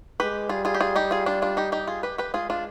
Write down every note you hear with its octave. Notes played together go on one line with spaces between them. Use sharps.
G#3 G4 B4
G3 F4 G#4
F4 G#4
G4
F4 G#4
D#4 G4
F4 G#4
D4 F4
D4 F4
D#4 G4
D#4 G4
F4 G#4
G4 B4
G4 B4
G#3 F4 G#4
D4 F4